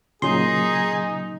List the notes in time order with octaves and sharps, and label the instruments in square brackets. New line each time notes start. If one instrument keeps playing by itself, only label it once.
[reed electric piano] A#2 C#3 F#3 [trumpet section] D#4 [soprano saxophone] G#4 [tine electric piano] C6